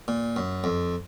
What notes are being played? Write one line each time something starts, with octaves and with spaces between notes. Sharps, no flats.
A#2
F#2
F2